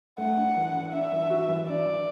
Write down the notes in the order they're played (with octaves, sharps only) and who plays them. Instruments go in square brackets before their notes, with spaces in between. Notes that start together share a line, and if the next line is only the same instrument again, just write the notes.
[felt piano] A3 [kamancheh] F#5
[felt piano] D4
E3
D4
[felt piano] D4 [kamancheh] E5
[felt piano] E3
F#4
E3
[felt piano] D4 [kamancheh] D5
[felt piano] E3